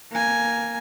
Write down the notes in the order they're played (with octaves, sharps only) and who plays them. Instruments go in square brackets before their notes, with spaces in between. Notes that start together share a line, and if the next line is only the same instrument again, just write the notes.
[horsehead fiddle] A#3 G#5